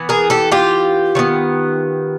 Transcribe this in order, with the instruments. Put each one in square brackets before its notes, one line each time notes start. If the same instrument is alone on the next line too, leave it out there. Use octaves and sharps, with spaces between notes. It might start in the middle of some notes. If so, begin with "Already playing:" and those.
Already playing: [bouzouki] E3 B3
G#4 A#4
G4 A4
F4 G4
D#3 F#3 B3